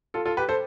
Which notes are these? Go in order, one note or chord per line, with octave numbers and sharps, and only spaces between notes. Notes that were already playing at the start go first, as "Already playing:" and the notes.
F4 A4
F4 A4
G4 B4
A4 C5